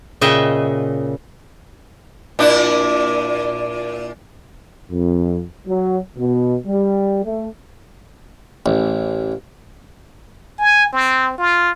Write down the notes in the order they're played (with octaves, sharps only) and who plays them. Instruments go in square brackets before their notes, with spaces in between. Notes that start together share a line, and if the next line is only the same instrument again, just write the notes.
[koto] A#2 C#3 D#5 E5 G5
[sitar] A#2 D4 E4
[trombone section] F2
F#3
B2
G3
A3
[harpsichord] A1
[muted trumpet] G#5
C4
F4